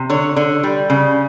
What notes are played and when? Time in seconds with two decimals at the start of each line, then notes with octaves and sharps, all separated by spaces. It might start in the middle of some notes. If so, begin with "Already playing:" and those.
Already playing: C3
0.10 D3 C#5
0.37 D3
0.63 G3
0.90 C#3